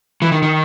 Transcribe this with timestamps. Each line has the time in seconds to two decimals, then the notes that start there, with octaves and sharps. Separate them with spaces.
0.22 E3
0.32 D#3
0.43 D#3